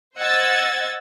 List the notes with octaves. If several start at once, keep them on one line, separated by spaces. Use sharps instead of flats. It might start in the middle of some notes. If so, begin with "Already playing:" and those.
C5 D#5 F#5 E6 G#6 A6